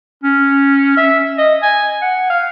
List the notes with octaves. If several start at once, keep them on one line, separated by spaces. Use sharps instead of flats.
C#4
E5
D#5
G#5
F#5
F5